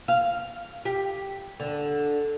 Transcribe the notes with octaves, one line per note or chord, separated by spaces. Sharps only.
F5
G4
D3